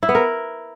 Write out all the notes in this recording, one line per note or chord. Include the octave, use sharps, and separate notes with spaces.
E4
B3
A#4